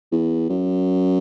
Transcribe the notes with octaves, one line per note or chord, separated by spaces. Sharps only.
E2
F#2